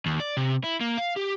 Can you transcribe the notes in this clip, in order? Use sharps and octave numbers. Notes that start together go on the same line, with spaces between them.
D#2
D5
C3
E4
A#3
F5
G4